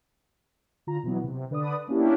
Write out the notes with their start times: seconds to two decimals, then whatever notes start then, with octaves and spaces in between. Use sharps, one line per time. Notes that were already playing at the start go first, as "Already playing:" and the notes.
0.87 D3 F4 A#5
1.03 B2 E3 F#3 B3
1.24 C3
1.51 D3 B4 D5 D#6
1.87 A#3 B3 C#4 D4 E4 G4